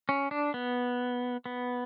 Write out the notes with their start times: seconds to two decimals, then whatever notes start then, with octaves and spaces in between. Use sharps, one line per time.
0.09 C#4
0.31 D4
0.54 B3
1.46 B3